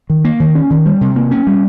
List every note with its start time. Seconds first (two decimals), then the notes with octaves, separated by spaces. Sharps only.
0.10 D#3
0.25 A#3
0.40 D#3
0.55 C#4
0.70 D#3
0.86 G3
1.01 C3
1.16 A#3
1.31 C#4
1.47 G3